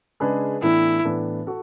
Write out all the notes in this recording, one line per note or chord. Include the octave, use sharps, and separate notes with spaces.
C#3 G#3 D4 G#4 B4
A2 E3 B3 D4 E4
A2 E3 B3 D4
F#4 A4